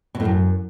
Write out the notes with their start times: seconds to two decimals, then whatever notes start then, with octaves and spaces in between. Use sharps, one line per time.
0.15 B2
0.20 A2
0.25 F#2